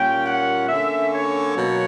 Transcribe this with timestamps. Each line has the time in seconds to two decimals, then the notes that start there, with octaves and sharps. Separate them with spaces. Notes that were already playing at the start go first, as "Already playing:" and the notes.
Already playing: A#2 G3 A#3 C#4 G5
0.26 F#5
0.68 D3 A#3 C#4 E5
1.11 C#5
1.54 B2 F#3 A#3